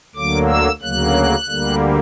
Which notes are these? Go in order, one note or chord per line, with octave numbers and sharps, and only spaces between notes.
D2 D3 F#3 A#3 D6
E6
D2 C#3 F#3 A#3 F#6
D2 D3 G3 A#3